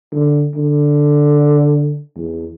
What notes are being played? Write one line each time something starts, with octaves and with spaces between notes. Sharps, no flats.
D3
D3
E2